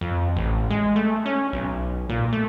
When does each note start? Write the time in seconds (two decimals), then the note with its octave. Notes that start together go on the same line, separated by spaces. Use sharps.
0.01 F2
0.36 A1
0.70 G#3
0.96 A3
1.26 C#4
1.53 B1
2.09 A#2
2.33 A3